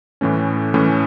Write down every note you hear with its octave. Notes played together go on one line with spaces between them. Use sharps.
A2 E3 A3 C#4
A2 E3 A3 C#4